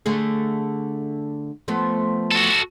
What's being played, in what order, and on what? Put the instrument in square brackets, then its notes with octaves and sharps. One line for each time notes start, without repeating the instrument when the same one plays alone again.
[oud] D3 A3 G#4
F3 A3 B3
[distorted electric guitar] F#4 A4